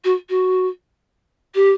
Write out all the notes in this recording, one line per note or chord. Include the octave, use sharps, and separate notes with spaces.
F#4
F#4
G4